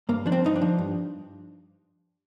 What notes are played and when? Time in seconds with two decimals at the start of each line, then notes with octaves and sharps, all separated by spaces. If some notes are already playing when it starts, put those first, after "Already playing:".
0.09 G2 A#3
0.26 F3 D4
0.32 C4
0.44 G2 D#4
0.56 D4
0.61 F3
0.78 G2